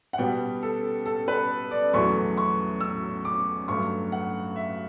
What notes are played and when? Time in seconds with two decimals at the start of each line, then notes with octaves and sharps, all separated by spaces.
0.13 F#5
0.18 B2 G3 B3 G5
0.63 A4
1.06 A4
1.28 B4
1.71 D5
1.93 E2 B2 F#3 A3 C#6
2.37 C#6
2.81 E6
3.25 D6
3.68 G2 F#3 A3 C#6
4.12 F#5
4.56 E5